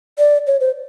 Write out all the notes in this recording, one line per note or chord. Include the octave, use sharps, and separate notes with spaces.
D5
C#5
C5